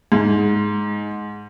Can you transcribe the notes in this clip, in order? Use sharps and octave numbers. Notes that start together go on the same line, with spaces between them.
G#2